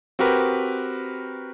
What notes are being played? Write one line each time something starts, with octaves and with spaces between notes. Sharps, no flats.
C4 F#4 G4 A#4 B4